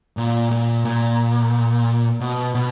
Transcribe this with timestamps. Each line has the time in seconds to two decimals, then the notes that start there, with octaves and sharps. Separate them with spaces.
0.17 A#2
0.51 A#2
0.85 A#2
2.20 B2
2.55 B2